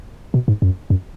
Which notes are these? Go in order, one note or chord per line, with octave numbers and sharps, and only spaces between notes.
B2
G#2
F#2
F#2